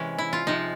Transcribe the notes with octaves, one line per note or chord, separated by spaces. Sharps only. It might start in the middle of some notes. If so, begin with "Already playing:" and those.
Already playing: C3 E3 G#3 C#4
E4
F4
C3 F3 G#3 D#4